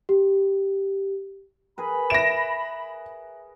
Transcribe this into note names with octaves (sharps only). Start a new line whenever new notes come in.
G4
G#4 A#4 B4 B5
E5 A#6 D7 E7